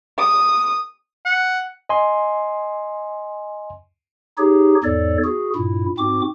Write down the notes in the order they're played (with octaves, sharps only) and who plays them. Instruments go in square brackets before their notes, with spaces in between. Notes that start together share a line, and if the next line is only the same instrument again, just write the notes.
[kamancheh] D#6
[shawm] F#5
[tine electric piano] D#5 G#5 C6
[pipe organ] D#4 G4 G#4 C#5
E2 G#2 A4 C#5 D5
F#4 G#4
G2 A#2 E4
G#2 C4 F#4 D6